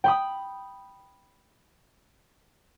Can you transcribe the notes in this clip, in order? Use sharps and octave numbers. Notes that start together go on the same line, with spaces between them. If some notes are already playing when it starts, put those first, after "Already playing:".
G5 B5 D#6